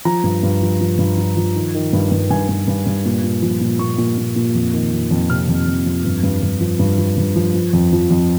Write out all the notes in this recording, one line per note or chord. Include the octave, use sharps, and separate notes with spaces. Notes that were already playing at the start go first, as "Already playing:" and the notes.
F3 A#5
G2
G2
F3
F3
G2
F3
F3
D#3
D#3
G2
G2
G2 G#5
G2
G2
G2
A#2
A#2
F3
A#2
A#2 C#6
A#2
A#2
A#2
F2
D#3
F2
F2
C3 F6
F2
F2
F2
G2
G2
G2
F3
G2
F3
G2
F3
F3
F2
F3
F2